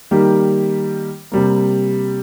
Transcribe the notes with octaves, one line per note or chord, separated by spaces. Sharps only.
D#3 G3 A#3 G4
C3 G3 A#3